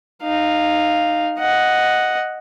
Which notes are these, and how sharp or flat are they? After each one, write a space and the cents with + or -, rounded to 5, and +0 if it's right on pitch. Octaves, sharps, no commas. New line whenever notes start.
D#4 -15 F5 +0
D#5 +0 F#5 +0